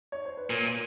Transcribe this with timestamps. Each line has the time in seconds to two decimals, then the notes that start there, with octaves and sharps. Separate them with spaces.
0.12 C#5
0.25 C5
0.37 B4
0.50 A#2 A#4